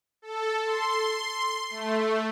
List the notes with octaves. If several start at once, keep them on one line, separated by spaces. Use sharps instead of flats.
A4
C6
A3